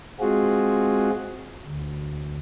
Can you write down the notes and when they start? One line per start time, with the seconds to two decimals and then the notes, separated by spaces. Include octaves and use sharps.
0.20 G#3 C4 F4 F#4 G#4
1.66 D2